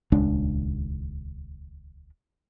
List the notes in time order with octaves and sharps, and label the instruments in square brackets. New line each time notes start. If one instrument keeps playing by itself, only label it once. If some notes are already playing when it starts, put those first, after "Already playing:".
[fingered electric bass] D#1 C#2 G#3 D4